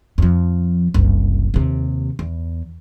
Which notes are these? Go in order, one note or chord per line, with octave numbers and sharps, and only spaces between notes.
F2 F3
F#1 C2
D#2 C3
E2